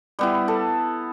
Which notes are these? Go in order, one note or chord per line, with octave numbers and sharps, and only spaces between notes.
G3 B3 E4
A4